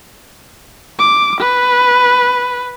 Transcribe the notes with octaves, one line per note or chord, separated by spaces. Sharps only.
D6
B4